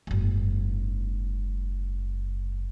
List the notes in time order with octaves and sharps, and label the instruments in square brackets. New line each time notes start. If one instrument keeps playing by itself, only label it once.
[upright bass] F#1 G#2